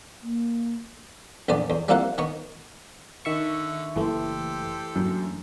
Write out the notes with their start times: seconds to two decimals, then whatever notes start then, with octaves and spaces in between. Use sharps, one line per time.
0.22 A#3
1.49 A#1 E2 B3 D5
1.70 E2
1.88 G3 A#3 C4 E4 F4 F#5
2.18 D#3 B3 C#6
3.25 D3 D#3 E5 C#6
3.96 F#1 E3 A3 A#3 G4 A4 C5
4.95 F#2 F#3 A#3 D4